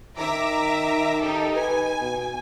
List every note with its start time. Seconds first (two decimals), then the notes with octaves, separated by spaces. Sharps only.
0.18 D#3 E5 A#5 D6
1.22 D#4 G4 A4
1.55 B4 G#5
2.00 B2